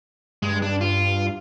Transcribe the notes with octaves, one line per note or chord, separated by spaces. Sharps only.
G2 G#3
D4
F4